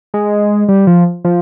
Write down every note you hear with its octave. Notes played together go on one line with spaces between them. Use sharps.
G#3
G3
F3
F3